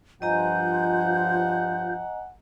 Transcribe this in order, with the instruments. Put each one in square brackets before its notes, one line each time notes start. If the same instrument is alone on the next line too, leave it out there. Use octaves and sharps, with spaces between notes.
[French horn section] G2 F3 [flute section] F4 G6 [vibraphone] D#5 G#5 A#5 [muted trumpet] F#5